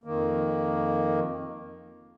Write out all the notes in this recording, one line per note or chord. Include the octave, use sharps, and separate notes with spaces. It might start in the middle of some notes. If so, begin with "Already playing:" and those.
F2 D#3 A#3